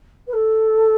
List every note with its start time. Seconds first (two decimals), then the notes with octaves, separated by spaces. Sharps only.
0.27 B4
0.33 A4